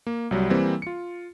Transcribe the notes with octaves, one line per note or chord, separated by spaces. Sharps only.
A#3
C2 F#3 G3
E3 G3 A#3 C4
F4 C#7